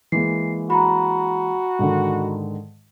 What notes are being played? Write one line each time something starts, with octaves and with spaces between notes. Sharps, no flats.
E3 G#3 A#3 C7
F#4 A#5 B5
G#2 D3 D#3